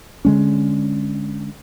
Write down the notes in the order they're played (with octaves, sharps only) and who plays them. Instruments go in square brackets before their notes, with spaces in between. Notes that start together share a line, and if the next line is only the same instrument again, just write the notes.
[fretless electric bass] D3 G#3 C#4